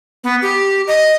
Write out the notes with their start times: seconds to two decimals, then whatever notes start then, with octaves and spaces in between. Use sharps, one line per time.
0.24 B3
0.42 G4
0.88 D#5